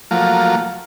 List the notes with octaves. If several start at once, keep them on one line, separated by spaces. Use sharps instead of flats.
F3 F#3 A3 A#3 F4